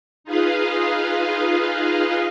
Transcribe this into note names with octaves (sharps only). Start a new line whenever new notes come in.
D#4 F4 G#4 B4 D#5 F5